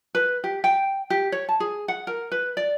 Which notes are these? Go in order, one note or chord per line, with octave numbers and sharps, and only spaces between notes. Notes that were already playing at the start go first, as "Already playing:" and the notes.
B4
G4
G5
G4
C#5
A5
G#4
F#5
A#4
B4
D5